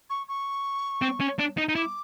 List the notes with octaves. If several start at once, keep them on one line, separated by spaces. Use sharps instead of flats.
C#6
C#6
C4
C#4
D4
D#4
D#4
E4 D6